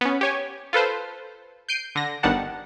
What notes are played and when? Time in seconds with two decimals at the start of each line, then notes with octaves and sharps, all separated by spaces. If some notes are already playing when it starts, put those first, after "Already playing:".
0.01 B3 C#4
0.21 G4 C#5 G#5
0.73 F4 A4 B4 C5
1.69 G6 C7 D7 D#7
1.95 D3 A#6
2.23 G1 D#3 G3 F#5 A5